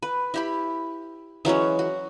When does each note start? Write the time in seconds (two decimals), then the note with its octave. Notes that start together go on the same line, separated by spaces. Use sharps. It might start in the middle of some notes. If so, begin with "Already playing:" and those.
0.02 B4
0.34 E4 G4 B5
1.45 E3 F#3 G#3 C#4
1.79 F#4